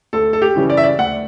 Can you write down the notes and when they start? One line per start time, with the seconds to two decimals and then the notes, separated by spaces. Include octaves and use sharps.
0.13 D2 A4
0.33 A4
0.42 G4
0.55 C#3 E3 G3 C#4
0.70 D5
0.77 E5
0.84 D5
0.99 D2 F#5